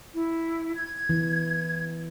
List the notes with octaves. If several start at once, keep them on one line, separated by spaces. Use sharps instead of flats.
E4
G#6
E3